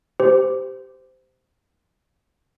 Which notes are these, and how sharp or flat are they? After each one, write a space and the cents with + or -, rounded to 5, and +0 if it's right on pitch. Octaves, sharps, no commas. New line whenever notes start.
G4 +0 C5 -20